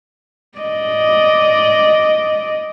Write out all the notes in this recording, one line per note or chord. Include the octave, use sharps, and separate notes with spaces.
D5 D#5